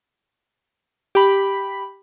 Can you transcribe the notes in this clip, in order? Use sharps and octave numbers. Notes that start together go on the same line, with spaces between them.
G4 B5